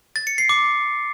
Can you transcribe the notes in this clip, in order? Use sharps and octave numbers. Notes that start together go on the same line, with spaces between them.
A6
C#7
C7
D6